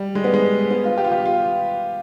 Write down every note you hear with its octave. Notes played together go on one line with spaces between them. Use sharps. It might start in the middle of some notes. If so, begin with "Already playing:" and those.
Already playing: G3
G#3
B3
G#3
B3
F4
G4
F4
G4
F4